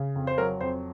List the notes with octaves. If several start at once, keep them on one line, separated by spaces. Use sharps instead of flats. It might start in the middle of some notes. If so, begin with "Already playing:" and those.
Already playing: C#3
F2
C5
F#3 A#4
F2 C5